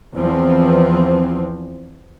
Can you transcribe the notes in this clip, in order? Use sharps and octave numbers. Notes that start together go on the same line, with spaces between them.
E2 E3 F3 C4